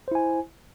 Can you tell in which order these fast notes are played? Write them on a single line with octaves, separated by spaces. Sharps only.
C5 E4 G#5